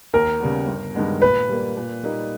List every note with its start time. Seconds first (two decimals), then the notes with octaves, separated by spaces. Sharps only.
0.13 D#2 A#4
0.40 C#3 G3 B3
0.68 G1
0.95 G2 D#3 G#3 B3
1.22 A#2 B4
1.49 G3 A#3
1.77 A#2
2.03 G3 A#3 D#4